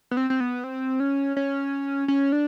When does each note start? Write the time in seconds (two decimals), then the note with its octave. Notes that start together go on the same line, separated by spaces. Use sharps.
0.11 B3
0.17 C4
0.30 C4
0.40 B3
0.64 C4
1.00 C#4
1.37 C#4
2.08 C#4
2.32 D4